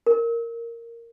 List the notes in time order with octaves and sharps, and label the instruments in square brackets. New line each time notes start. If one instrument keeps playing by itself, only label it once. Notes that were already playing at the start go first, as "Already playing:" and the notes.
[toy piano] A#4